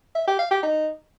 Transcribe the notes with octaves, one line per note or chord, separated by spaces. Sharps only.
E5
G4
F5
G4
D#4